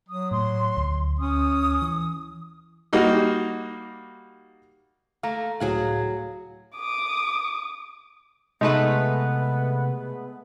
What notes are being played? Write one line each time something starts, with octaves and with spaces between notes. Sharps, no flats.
F#3 D#6
A2 C6
D2
C#4 D#6
E3
G3 A#3 D#4 F#4
A3 F5 A#5
C#2 A2 F#3 G#4 F5 F#5
D6 D#6
C3 G#3 A3 B3 D#4 B4